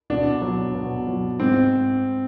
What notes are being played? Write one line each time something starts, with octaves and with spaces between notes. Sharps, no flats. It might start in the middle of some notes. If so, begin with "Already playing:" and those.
B2 D4
F#3
B2
F#3
G#2 C4